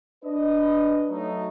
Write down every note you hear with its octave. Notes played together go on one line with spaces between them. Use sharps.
D4 B4 D#5
F#3 A3 D#4